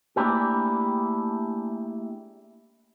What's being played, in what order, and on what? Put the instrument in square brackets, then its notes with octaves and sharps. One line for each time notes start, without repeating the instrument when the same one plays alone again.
[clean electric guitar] A3 A#3 D4 E4 G4 G#4